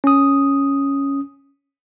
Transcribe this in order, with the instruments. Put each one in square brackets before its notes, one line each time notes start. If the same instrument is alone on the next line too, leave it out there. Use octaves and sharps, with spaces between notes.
[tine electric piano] C#4 D#6